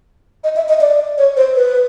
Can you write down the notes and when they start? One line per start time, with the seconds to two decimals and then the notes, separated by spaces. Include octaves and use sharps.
0.44 D#5
0.56 E5
0.69 D#5
0.81 D5
1.18 C#5
1.37 C5
1.56 B4